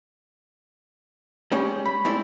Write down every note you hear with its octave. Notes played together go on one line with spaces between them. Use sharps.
G3 G#3 C#4 G4
B5
G#3 A3 C4 D4 E4 D5